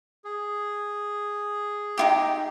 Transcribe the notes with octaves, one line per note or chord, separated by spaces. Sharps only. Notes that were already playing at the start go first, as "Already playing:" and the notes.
G#4
D#4 F4 G4